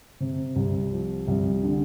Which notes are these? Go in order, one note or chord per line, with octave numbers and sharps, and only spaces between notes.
C3
C2
F3
C2
D3